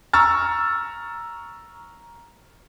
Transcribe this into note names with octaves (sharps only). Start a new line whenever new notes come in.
A#5 C#6 E6 F6 A6